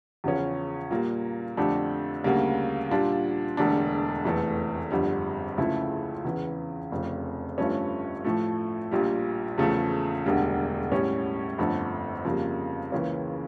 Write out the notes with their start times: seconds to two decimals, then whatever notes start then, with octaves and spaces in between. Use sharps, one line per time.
0.24 E2 C#3 F3 C#4
0.91 A#2 G3 A#3
1.57 F2 D3 A3 D4 G4
2.24 D2 C#3 G3 A#3
2.90 A#2 G3 D4 F4
3.57 E1 E2 D3 A3 D4
4.24 F1 E2 E3 A3
4.90 G1 F2 D3 G3
5.58 C#2 C#3 F3 A3 E4
6.24 E2 C#3 E3
6.92 F1 F2 C#3
7.58 G1 G2 F3 A3 C#4
8.24 A2 F3 A3
8.91 A#1 A#2 G3
9.58 E2 C#3 F3 A3
10.24 E1 D2 D3 G3
10.92 A2 G3 C#4
11.58 G1 F2 D3 A3
12.25 F2 C#3 G3 A#3
12.92 C#2 C#3 E3 A#3 C#4